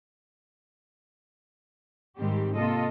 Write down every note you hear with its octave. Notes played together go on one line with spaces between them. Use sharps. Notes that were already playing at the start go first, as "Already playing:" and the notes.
G#2 D#3 G3 G#3 C4 G4
C3 A#3 F4 A4 D#5